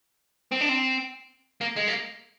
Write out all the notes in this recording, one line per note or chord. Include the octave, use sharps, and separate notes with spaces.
C4
D4
C4
A#3
G#3
A#3